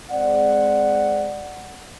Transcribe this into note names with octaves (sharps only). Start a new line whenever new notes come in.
G#3 C4 D5 F#5